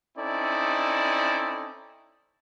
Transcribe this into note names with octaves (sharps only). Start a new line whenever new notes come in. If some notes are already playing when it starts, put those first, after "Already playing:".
C4 C#4 D#4 E4 A4 D5